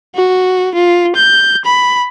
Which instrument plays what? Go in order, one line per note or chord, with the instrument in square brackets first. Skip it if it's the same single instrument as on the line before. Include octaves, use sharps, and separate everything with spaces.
[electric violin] F#4
F4
G6
B5